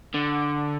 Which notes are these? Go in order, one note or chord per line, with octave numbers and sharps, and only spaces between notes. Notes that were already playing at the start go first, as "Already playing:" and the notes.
D3